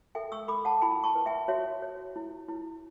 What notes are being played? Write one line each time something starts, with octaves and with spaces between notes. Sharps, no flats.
A4 E5 G5
C#6 E6
A4 B5 D6
F#5 A5
E4 G5 B5
A5 C#6
B4
E5 G5
F#4 C#5 E5
C#5
E4
E4